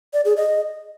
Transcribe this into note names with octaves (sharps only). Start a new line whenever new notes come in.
D5
G#4
D#5